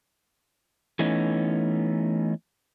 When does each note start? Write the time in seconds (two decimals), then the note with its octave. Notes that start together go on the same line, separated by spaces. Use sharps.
0.99 E3 A3 B3 C#4 D#4